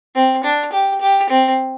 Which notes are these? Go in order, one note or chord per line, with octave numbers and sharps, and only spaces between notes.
C4
D4
G4
G4
C4